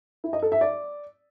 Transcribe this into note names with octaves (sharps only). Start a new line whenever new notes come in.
E4
D#5
A4
E5
D5